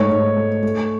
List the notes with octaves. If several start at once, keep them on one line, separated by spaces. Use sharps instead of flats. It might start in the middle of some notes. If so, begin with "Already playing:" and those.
Already playing: G#2 A3 C#5
G#2
A3
A3